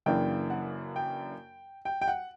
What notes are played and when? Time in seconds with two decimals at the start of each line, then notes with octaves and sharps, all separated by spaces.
0.06 F#2 C#3 E3 A#3 D4 G5
0.50 F#5
0.96 G5
1.85 G5
2.02 G5
2.08 F#5